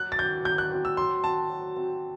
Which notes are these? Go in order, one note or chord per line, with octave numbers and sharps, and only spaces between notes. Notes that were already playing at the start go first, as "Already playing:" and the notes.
Already playing: F#3 F#6
A6
C4 F#4 G6
F#3 G6
F#6
C4 F#4
E6
F#3 C6
C4 F#4 A5
F#3
C4 F#4